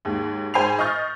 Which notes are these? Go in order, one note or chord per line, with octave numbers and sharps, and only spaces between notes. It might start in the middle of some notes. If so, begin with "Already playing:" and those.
D#2 G#2
G#2 C5 G#5 B5 C7 F7
D#5 C#6 D#6 F6 G6 A6